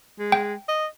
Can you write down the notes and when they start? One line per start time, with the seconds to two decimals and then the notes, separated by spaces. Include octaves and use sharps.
0.19 G#3
0.32 G5
0.68 D#5